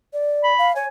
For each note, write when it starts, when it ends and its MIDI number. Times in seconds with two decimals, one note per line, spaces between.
0.13 0.53 74
0.44 0.69 83
0.58 0.72 77
0.75 0.84 73
0.75 0.88 80